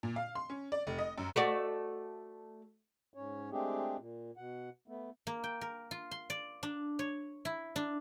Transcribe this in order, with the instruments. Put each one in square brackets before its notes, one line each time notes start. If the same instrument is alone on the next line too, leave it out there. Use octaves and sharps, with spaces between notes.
[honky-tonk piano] A#2
F5
C6
C#4
D5
F1
D#5
F#2
[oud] A3 F#4 D5
[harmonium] G#2 C#4 C#5
G#3 A3 C4 D4 G4 G#4
A#2
B2 F#5
A3 B3
[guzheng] A#3
G5
A#4
F4
C6
D5
D4
C#5
E4
D4